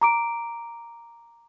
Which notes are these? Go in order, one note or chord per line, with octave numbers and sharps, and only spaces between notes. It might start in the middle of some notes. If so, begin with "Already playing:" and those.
A#5 D6 D7